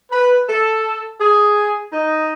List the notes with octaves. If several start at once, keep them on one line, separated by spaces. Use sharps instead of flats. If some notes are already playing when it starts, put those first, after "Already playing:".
B4
A4
G#4
D#4